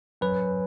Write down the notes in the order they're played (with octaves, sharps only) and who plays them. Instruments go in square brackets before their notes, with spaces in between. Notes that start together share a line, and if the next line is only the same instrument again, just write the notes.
[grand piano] F#2 [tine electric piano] B4